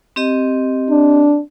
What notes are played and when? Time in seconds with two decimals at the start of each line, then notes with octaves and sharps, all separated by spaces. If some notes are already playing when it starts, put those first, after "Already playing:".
0.16 C4 G4 D#5
0.90 D4